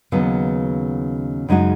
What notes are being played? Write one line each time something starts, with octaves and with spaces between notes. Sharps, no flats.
D#2 C#3 F#3 B3
F#2 C#3 G#3 D#4 F#4